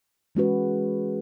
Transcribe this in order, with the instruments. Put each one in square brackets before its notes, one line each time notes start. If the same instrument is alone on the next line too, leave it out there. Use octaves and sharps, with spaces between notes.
[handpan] E3 G#3 C#4 F#4 B4